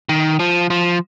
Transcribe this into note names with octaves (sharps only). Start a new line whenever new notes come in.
D#3
F3
F3